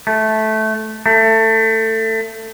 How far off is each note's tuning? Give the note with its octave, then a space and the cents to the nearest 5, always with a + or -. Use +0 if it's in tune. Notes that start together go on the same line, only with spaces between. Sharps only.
A3 -10
A3 +20